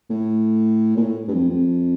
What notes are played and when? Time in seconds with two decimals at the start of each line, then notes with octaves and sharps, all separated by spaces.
0.10 A2
0.96 A#2
1.03 A2
1.28 G2
1.33 F2
1.50 F2